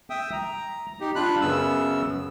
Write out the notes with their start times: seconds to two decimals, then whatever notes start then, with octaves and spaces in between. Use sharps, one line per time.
0.10 E5 G5 D#6
0.33 A#5
1.01 D#4 G4
1.15 D4 F4 B5 F#6
1.41 F#2 C#3 B3 E6